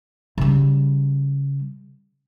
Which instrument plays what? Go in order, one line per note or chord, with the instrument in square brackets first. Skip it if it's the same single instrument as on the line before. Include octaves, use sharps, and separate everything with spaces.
[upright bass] C#3 G3